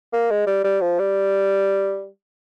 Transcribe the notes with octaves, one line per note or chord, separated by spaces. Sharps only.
A#3
G#3
G3
G3
F3
G3